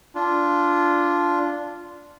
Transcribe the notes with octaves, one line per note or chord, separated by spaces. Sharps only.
D4 F4